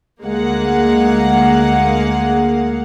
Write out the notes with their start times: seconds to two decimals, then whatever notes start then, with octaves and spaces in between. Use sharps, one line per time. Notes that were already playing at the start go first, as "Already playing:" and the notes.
0.21 D2 G#3 A#3 F5 F#5